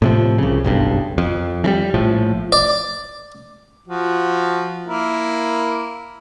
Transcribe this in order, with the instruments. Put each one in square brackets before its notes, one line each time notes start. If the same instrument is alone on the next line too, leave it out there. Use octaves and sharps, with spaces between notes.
[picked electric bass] A2 C3 F3
C2 C#3
F#1 B1 G2
F2
E3 G3
A#1 A2 F3
[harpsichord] D5
[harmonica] F3 F#4
A#3 E4 A#4